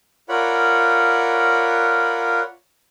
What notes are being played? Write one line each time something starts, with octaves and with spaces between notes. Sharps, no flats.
F4 A#4 C#5 D5 F#5 B5